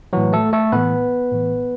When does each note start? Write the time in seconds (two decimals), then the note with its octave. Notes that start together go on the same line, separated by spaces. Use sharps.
0.13 A2 E3 F#3 F#4
0.33 A3 A4
0.53 A3 A4
0.72 A2 E3 B3 B4
1.32 A2 E3